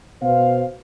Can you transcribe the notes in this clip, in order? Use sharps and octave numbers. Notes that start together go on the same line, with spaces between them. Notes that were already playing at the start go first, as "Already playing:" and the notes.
B2 C5 F5